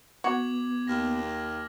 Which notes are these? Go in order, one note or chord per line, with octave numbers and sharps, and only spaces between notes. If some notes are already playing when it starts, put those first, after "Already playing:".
B3 F#4 D6 G#6 F#7
D#2 F6 A#6